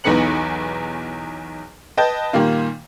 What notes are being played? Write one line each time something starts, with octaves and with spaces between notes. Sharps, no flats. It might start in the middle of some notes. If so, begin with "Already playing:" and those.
B1 E2 D#4 B4 C#7 F#7
B4 D#5 G5 A5 G6
A#2 D#3 G3 A#3 F4